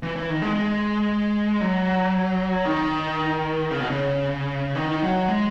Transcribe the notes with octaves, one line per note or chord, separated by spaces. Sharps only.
E3
E3
D#3
G#3
G#3
F#3
D#3
C#3
B2
C#3
D#3
F#3
G#3